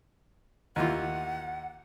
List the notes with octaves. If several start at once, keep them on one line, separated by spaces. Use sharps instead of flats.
D#2 E3 F4 F#5